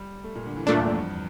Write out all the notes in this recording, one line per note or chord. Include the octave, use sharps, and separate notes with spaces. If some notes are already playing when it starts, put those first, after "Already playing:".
Already playing: G3
A3
A#2
D3
E3
G2 A#2 A3 D4
E2
F2
G2